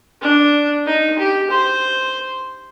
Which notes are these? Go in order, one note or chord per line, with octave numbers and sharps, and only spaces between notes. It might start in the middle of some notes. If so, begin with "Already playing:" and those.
D4
D#4
G4
C5